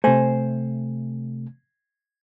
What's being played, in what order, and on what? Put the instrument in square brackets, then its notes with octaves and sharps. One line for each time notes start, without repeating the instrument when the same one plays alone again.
[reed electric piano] C3 A3 [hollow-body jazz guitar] C5 G#5